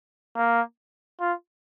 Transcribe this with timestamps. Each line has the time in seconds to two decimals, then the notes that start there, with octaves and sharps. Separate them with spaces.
0.36 A#3
1.20 F4